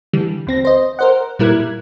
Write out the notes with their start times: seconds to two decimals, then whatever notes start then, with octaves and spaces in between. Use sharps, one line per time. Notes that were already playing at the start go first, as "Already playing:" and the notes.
0.13 D3 E3 G3
0.47 D2 C4 A#6
0.65 C5 D#5
0.99 A#4 C5 F#5
1.39 A#2 G3 E4 A#4 F#6 G#6